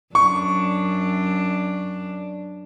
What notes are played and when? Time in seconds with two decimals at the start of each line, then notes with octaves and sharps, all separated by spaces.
0.15 F#2 D4 C#6